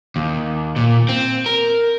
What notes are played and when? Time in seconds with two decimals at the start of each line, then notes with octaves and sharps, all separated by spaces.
0.16 D#2
0.76 A#2
1.09 C4
1.46 A#4